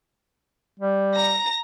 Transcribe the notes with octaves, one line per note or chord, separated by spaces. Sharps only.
G3
A#5 A#6